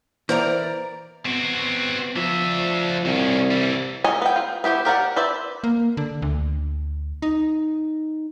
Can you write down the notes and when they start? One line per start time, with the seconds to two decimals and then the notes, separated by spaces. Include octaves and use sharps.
0.29 E3 A#4 C5 D5 A#5
1.26 B3 C4 F#4
2.16 F3 D4 E5
3.05 C2 D#3 C#4
3.51 E3 G3
4.04 G#3 C#5 D#5 G#5
4.22 B3 G5
4.36 F4
4.64 B3 E4 G4 C5
4.85 G4 A#4 D5 F#5
5.16 B4 C5 D5 E5
5.64 A#3
5.97 D3
6.22 D2
7.22 D#4